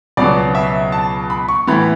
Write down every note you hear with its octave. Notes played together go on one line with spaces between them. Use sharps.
C#2 B2 F#3 B3 D5
E5
A5
B5
C#6
A2 E3 B3 B5